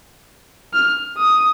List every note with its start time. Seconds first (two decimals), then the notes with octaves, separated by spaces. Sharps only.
0.73 F6
1.18 D#6